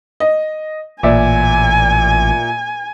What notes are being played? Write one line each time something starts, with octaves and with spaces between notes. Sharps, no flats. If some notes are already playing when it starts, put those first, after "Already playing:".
D#5
A1 A#2 D5 E5 G#5